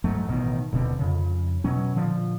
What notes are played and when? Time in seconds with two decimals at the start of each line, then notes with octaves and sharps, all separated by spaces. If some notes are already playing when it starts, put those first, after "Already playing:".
0.04 G#2 F#3 A3
0.28 A1 B2 D#3
0.73 D#1 B2 D3 C4
0.99 F2 C#3
1.64 B2 F#3 C#4
1.95 A#2 D3 F3